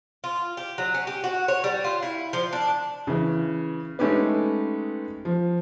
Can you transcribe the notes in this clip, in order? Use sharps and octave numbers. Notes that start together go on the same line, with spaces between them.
F4
G4
F#3
C#4
G4
F#4
C#5
G3
F4
E4
F3
D4
C#3 E3
G#3 A3 C#4 D#4 G4 B4
F3